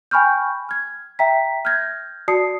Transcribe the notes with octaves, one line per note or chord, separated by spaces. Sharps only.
G5 G#5 B5 C#6 F6 G6
F6 G#6
E5 G5 A#5 B6
F6 G6 G#6 A#6
F#4 D5 A5 D#6 C7 C#7